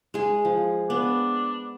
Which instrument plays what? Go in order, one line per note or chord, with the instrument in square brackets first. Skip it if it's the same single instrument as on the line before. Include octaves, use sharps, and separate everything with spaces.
[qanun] G#3 G#4
F3
[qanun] B3 [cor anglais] D4